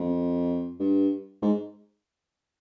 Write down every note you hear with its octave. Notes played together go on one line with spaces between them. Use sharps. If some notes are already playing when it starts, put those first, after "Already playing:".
Already playing: F2
G2
G#2